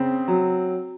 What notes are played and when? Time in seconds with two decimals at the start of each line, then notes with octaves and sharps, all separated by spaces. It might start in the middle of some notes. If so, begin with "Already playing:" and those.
Already playing: C#3 C4
0.28 F#3